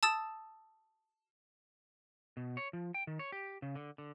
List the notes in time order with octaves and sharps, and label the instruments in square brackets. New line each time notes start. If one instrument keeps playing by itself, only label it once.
[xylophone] A5 D#6 E6 A6 E7
[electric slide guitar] B2
C#5
F3
G5
D#3
C#5
G4
C#3
D3
D3